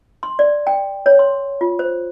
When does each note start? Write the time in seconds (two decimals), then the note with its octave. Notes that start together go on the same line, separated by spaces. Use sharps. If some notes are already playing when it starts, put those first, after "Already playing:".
0.23 C6
0.39 D5
0.67 G5
1.06 C#5
1.19 C6
1.61 F4
1.79 C5